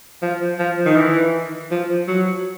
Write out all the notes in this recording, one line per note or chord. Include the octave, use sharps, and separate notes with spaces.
F3
F3
D#3
E3
F3
F#3